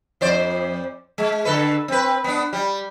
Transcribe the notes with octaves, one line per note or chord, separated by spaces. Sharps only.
F2 C5 D5
G#3
D3 A4 B4
C4 B4
B3 D4
G3